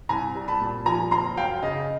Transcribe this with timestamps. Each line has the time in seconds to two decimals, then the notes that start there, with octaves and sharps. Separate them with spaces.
0.09 C2 G#5 A#5
0.35 G3
0.48 A5 B5
0.60 A#2
0.86 F3 G#5 A#5
1.11 F#1 A#5 C6
1.37 F#2 F5 G5
1.62 C#3 D#5 F5